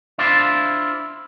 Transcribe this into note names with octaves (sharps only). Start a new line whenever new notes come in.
D4 E4 F4 C5